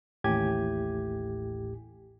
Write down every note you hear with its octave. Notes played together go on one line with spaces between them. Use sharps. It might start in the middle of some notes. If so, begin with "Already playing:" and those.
A1 D#2 A2 G4 G#5 G#6